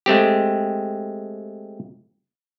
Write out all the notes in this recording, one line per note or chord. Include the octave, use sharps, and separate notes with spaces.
G#3 A3 C4 G4